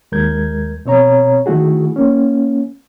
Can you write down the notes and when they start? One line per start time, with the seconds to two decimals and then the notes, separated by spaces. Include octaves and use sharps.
0.12 D#2 G#3 A#4 G6 G#6
0.85 B2 C4 C#5 A#5
1.46 D#3 A3 E4 F#4 G#4
1.96 A#3 C#4